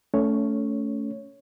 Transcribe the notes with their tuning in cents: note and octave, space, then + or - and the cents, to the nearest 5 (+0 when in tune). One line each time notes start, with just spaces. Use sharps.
A3 +0 C#4 +20 C#5 +0